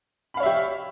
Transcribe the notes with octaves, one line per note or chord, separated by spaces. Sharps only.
G4 C#5 E5 F5 B5